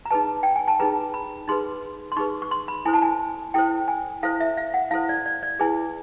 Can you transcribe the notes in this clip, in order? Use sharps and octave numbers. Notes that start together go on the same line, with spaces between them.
A#5
D#4 G#4 B4 A5
G5
G#5
A5
D#4 G#4 B4 A#5
B5
D#4 G#4 B4 C6
C6
D#4 G#4 B4 C#6
C#6
C6
B5
E4 A4 C5 G#5
A5
G#5
E4 A4 C5 G5
G#5
E4 A4 C5 F5
E5
F5
F#5
E4 A4 C5 F5
D5
D5
D5
E4 G#4 B4 G#5